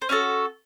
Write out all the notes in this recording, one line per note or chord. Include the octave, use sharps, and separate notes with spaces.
C5
C#4 F#4 A4 C#5